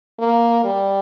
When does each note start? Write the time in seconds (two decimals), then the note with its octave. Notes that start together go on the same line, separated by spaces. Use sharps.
0.19 A#3
0.64 G3